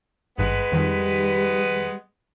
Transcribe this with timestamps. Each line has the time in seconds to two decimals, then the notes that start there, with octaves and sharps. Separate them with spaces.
0.38 G#1 G2 G#3 B3 B4
0.72 F2 D#3 G3